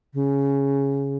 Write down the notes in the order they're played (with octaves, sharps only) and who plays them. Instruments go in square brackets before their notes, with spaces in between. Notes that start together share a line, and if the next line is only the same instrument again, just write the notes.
[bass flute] C#3